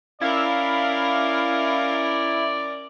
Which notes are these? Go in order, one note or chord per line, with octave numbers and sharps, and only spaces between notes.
C#4 E4 A#4 D5 F5